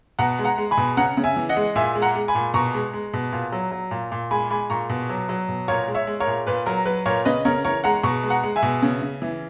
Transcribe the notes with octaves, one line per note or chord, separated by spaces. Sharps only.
B2 F#5 A#5
G#3
F#5 A#5
G#3
G#5 B5
B2
C#3 F#5 A#5
C#3
E5 G#5
E3
D#5 F#5
G#3
A#2 E5 G#5
G#3
F#5 A#5
G#3
G#5 B5
A#2
B2 A#5 C#6
G#3
G#3
B2
A#2
F#3
F#3
A#2
A#2
G#3 G#5 B5
G#3 G#5 B5
A#2 A#5 C#6
B2
F#3
F#3
B2
A#2 A#4 C#5
G#3
C#5 E5
G#3
A#4 C#5
A#2
A#2 B4
F#3 A#4
F#3 B4
A#2 A#4 C#5
C#3 B4 D#5
C#3 A#4 C#5
E3 A#4 C#5
G#3 F#5 A#5
B2 A#5 C#6
G#3
F#5 A#5
G#3
E5 G#5
B2
C#3
C#3
E3